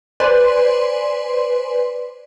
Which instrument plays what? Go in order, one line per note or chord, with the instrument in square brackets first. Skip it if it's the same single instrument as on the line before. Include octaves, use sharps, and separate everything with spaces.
[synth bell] B4 C5 D5 G#5 C6